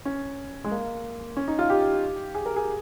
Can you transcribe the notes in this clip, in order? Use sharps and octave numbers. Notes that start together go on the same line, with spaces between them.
C#4
G#3
A#3
C#4
D#4
F4
G4
G#4
A#4
G#4